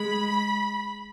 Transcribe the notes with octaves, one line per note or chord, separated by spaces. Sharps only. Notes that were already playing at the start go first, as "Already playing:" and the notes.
Already playing: G#3 B5